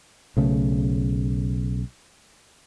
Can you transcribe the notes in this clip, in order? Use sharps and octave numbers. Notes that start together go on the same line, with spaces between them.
B1 C#3 A3